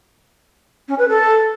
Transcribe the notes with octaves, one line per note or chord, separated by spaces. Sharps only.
C#4
B4
A4